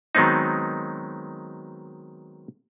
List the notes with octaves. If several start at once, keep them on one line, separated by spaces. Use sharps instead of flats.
D#3 F#3 G#3 B3 C4 D#4